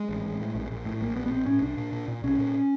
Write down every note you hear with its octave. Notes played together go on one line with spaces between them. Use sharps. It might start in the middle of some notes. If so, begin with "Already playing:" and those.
Already playing: G#3
A1
A1
A2
A#1
A#1
A2
A#1 A#3
A#1 B3
B3
A#1 C4
A2 C#4
C2 D4
A#2
A#2
A#2
C2 C#4
A#2